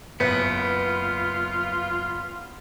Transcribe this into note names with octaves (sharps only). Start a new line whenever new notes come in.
F#1 B3 F4 B4